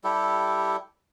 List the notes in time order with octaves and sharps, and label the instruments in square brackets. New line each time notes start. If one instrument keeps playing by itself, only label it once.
[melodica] G3 E4 G4 A4